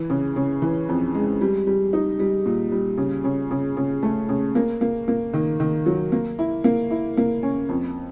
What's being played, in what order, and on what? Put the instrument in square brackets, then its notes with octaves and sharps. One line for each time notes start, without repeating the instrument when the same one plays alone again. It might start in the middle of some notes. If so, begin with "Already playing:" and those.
Already playing: [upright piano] E3
C#3
C#3
E3
F2
G#3
G3
G3
D#4
G3
A#2
G3
C#3
C#3
C#3
C#3
A3
C#3
A#3
A#3
A#3
D#3
D#3
F#3
A#3
E4
A#3
E4
A#3
C#4
F2